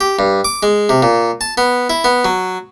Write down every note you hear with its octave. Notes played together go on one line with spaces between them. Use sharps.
G4
G2
D6
G#3
C3
A#2
A5
B3
E4
B3
F#3